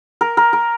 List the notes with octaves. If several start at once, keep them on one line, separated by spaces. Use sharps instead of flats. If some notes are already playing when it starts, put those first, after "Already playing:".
A#4
A#4
A#4